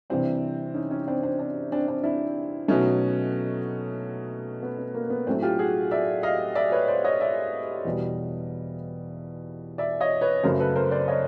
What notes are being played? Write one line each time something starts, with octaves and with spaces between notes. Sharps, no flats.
C3 E3 G3 C4 D4
C#4 D#4
C#4 D#4
C4 D4
C4 D4
C4 D4
C4 D4
C4 D4
D4 E4
B2 F#3 A3 C#4 D#4
B3
B3
A#3
B3
A2 F#3 A3 C4 D4
F4 G4
F#4 G#4
D5 E5
D#5 F5
D5 E5
B4 C#5
C5 D5
C#5 D#5
D5 E5
E2 B2 G3
D5 E5
C#5 D#5
B4 C#5
F#2 C#3 F#3 A3 A#4 C5
A4 B4
A#4 C5
C5 D5
C#5 D#5